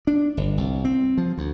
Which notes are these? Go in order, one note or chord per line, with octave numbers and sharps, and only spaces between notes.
D4
G1
C2
C4
F3
D2